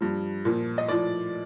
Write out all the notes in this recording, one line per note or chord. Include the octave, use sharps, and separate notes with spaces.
G2 F3
A#2 F3
D#5
A2 F3 D5